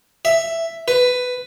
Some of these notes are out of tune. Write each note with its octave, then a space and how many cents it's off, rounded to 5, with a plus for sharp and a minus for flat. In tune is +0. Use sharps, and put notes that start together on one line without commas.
E5 +5
B4 +10